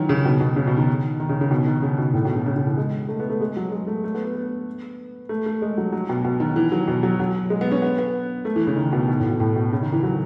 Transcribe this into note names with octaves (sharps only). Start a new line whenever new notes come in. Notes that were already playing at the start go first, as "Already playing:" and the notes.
Already playing: D#3 E3 F#3
C#3
B2
B2
C#3
B2
D#3
D#3
C#3
C#3
B2
D#3
C#3
B2
A2
B2
C#3
C#3
C#3
E3
G#3
A3
B3
A3
G#3
F#3
G#3
A3
A3
B3
B3
B3
A3
A3
G#3
F#3
F#3
B2
B2
D#3
E3
F#3
B2
F#3
F#3
G#3
B3
C#4
B3
B3
A3
E3
C#3
D#3
B2
B2
A2
B2
A2
B2
C#3
D#3
E3
F#3